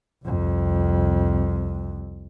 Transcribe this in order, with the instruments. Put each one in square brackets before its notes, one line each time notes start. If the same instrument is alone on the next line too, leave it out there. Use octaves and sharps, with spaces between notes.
[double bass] C2 F2